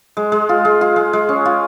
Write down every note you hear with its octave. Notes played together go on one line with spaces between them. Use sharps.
G#3
G#3
F4
G#3
F4
G#3
G#3
C#4
F4